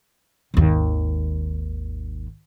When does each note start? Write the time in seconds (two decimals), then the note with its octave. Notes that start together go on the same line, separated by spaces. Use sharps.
0.54 G#1 D#2